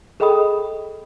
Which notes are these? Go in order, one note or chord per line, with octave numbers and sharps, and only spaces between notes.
G#4 A4 D#5 G5 B5 D#6